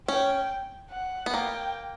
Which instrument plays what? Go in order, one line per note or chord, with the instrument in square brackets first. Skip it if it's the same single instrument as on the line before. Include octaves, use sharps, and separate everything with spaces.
[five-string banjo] C#4 [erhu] G5
[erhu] F#5
[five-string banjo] B3
[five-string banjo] A#3 [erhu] G5